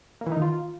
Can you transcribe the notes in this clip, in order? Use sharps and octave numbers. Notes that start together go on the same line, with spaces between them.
A#3
E3
D#4
D#3
F4